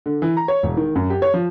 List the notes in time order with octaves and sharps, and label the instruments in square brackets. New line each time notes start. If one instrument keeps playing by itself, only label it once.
[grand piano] D3
E3
A#5
C#5
E1
D#3
F#2
G4
C#5
F3